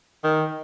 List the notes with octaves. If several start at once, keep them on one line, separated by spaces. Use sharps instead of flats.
D#3